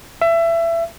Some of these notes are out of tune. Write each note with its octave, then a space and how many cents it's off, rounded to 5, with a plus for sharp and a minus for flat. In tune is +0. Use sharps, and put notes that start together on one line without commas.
E5 +25